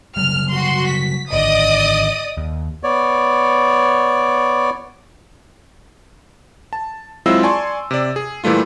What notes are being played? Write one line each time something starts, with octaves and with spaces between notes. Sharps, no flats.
C#3 F#3 G3 F6
F#4 C6
B6
G#1 D3 D5 D#5 D#6
D#2
B3 C#5 D5
A5
F#3 G#3 C4 E4 F4 E6
D5 G#5 A5 C6 C#6
C3 D5
G#4
A#2 E3 G3 A3 F4